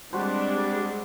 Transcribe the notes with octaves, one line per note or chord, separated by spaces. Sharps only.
G3 G#3 C4 D4 F#4 B4 C5